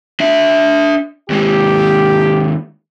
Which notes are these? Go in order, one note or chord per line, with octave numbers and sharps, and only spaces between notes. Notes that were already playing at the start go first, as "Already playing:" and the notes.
D4 E5
D#2 G#3 G4